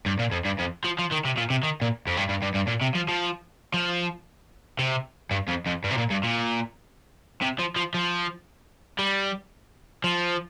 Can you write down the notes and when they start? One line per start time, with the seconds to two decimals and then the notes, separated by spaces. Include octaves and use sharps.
0.06 G2
0.19 A#2
0.32 F2
0.45 G2
0.59 F2
0.84 F3
0.99 F3
1.11 D#3
1.25 C3
1.37 A#2
1.50 C3
1.63 D#3
1.81 A#2
2.07 F2
2.17 G2
2.29 G2
2.43 G2
2.55 G2
2.68 A#2
2.82 C3
2.95 F3
3.09 F3
3.74 F3
4.79 C3
5.31 G2
5.48 F2
5.67 F2
5.84 G2
5.91 C3
5.97 A#2
6.10 G2
6.23 A#2
7.42 C3
7.59 F3
7.76 F3
7.94 F3
8.99 G3
10.04 F3